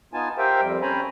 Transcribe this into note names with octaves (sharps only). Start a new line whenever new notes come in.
B3 D#4 F4 G#5 A5
G4 A#4 C5 E5 F5 G5
F2 G3
C4 C#4 C5 G#5 A#5 B5